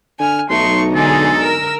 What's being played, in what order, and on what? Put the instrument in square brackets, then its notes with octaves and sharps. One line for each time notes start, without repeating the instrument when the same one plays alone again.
[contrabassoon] D3 [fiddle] G#5 F6
[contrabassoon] B1 [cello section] F#3 D#4 [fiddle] A3 C#6 [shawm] C6
[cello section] D3 D#4 [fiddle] G#3 G#4 [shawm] A4
[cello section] A#4 [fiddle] E6